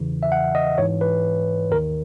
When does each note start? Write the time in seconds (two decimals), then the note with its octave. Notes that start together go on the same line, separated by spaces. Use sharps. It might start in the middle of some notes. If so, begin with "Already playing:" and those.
Already playing: E2 C#3 E3
0.23 E5
0.32 F#5
0.55 D#5
0.78 G#2 E3 C#5
1.01 B4
1.71 D#2 D#3 A#4